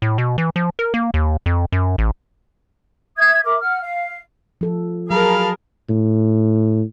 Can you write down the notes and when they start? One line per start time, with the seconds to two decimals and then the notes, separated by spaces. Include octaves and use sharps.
0.02 A2
0.18 B2
0.38 E3
0.56 F3
0.79 A#4
0.94 A#3
1.14 D#2
1.46 F2
1.72 F#2
1.98 A1
3.17 E5 D#6 G#6
3.43 A#4 E5 D6
3.60 F#5 F6
3.81 F5
4.61 F3 A4
5.11 F#3 G#4 A#4 F5 A5 B5
5.89 A2